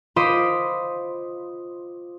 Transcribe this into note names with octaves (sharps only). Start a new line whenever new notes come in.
F4 C5 D#5 B5 D6